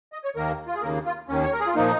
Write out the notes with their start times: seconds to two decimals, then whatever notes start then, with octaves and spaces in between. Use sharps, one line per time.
0.13 D#5
0.24 C#5
0.36 D#2 D#3 A#3 A#4
0.67 F4
0.75 G#4
0.82 D#2 C#3 A#3 A#4
1.05 F4
1.28 D#2 D#3 A#3 C#4
1.43 C#5
1.52 A#4
1.60 G#4
1.67 F4
1.75 A#2 F3 A#3 D#4